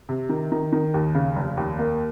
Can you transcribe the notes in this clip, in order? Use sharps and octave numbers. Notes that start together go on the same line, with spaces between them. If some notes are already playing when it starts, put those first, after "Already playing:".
C3
D#3
D#3
D#3
D#2
C#3
F1
D#2
A#3